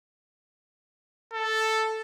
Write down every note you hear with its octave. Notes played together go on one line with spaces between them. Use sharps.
A4